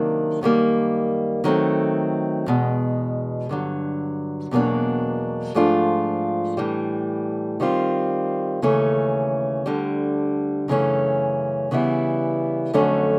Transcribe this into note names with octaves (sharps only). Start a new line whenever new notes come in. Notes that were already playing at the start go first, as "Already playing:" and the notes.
Already playing: C3 D#3 F#3 A#3 D4
F#2 D#3 G3 A#3
D#3 F#3 A3 C4
E2 B2 G#3
G2 D3 F#3
E2 B2 F#3 A#3 D4
G#2 F3 A3 D4 F4
A2 E3 G3
D#3 G3 C4 F4
D#2 C#3 E3 A3 C#4
D2 D3 G3
F#2 C#3 E3 A3 C#4
C#3 E3 G3 B3 E4
F2 D3 F#3 A3 C#4